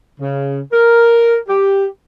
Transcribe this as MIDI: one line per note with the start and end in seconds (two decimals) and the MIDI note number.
0.20 0.60 49
0.72 1.37 70
1.48 1.85 67